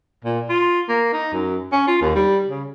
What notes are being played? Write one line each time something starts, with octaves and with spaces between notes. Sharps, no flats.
A#2
F4
A#3
D#4
F#2
C#4
F4
D#2
G3
C#3